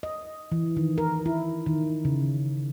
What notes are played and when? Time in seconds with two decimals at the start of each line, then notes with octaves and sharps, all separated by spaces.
0.03 D#5
0.52 E3
0.77 D#3
0.98 A#4
1.26 E4
1.66 D#3
2.05 C#3